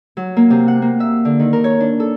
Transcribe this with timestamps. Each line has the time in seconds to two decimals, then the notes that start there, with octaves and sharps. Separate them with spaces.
0.17 F#3
0.37 A#3
0.50 C3
0.68 F#5
0.82 A#3
1.00 E5
1.25 D3
1.39 D#3
1.53 A#4
1.64 C#5
1.80 D4
2.00 A4